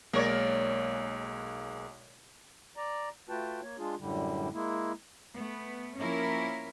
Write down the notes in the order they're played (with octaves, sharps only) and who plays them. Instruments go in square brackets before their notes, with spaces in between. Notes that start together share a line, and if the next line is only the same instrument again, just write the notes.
[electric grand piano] B1 G#3 A#3 [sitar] A#4 C#5 D5
[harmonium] D5 A#5
A3 F4 F#4 B4 G5 A5
A#3 C#5
G#3 D4 F4 G#4
F#2 A2 D3 G3
G#3 A#3 E4
[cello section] A3 B3
F3 A#3 C#4 E4 A#4